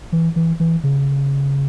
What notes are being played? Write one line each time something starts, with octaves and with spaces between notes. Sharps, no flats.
E3
E3
E3
C#3